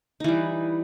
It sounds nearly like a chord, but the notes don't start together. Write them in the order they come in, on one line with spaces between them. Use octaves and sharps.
D#4 E3 G3